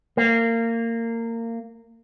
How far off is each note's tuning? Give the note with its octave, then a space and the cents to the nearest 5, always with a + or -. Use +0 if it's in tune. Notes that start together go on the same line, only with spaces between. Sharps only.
A#3 -25